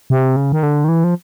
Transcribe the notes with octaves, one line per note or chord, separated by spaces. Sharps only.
C3
C#3
D#3
D3
D#3
E3
F3